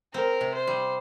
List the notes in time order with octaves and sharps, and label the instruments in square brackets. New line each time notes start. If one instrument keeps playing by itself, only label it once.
[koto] C4 [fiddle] A#4
[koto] C3
[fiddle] C5
[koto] G3